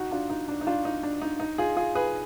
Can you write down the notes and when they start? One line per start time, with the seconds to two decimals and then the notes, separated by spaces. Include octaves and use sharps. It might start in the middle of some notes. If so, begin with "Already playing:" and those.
Already playing: D#4 F#4
0.11 D4 F4
0.30 D#4
0.48 D4
0.61 D#4
0.67 D4 F4
0.85 D#4
1.03 D4
1.22 D#4
1.40 D#4
1.58 F4 G#4
1.77 F4 G#4
1.95 G#4 B4